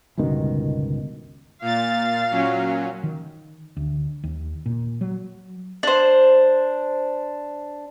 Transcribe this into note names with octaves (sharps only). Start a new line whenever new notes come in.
G1 C#2 B2 D#3
A#2 F5 A6
A#2 F#3 C#4
D#3
D2
D#2
A#2
F#3
D4 C5